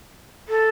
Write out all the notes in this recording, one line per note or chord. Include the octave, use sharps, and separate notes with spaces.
A4